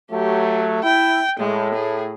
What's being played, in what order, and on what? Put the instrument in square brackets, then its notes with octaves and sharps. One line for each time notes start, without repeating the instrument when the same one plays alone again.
[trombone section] F#3 A3 [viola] G4
[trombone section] E4 [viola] G5
[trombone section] A2 [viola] G#3
[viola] G#4